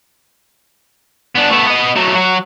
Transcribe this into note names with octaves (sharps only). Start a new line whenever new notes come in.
B3 D4
A3 B3
B3 D#5
F#3 A3
F#3 F#4